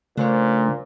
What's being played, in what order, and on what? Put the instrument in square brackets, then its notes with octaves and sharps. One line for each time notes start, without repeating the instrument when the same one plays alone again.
[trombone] A#2 [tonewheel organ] C#3 A3 [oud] D4 C5 C#5